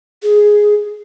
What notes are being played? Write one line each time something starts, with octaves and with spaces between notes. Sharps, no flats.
G#4